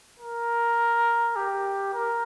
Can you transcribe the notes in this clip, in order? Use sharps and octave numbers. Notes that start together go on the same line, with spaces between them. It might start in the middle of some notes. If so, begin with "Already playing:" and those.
A#4
G4
A#4